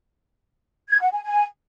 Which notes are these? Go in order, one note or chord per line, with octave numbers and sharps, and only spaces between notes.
G#6
F#5
G#5
G#5